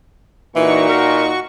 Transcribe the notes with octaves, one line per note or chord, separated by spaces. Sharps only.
A#2 E3 D#4 F#4 C#6
A#4